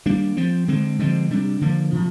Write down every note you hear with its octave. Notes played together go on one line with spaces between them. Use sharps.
D#3 G3 A#3 D4
F3 C4
D3 G#3 C4
D3 F3 G#3 C4
C3 G3 D4
D3 F3 A#3
C3 F3